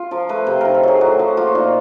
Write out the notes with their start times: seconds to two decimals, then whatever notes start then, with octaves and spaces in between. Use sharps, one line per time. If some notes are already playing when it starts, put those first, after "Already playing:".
Already playing: F4
0.11 F3 A#4
0.29 A3 B4
0.47 C3 C5
0.61 D#3 A#4
0.74 A4
0.83 F#3 G#4
1.01 A2 F#4
1.19 F3 F#4
1.37 A#3 F4
1.55 A#2 D#4